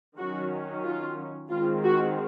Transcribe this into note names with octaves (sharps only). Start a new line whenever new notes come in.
D#3 F#3 C#4 F#4
F4
D#3 G#3 C4 F4
F#4